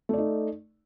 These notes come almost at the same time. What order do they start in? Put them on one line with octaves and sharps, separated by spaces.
A3 D5 D#4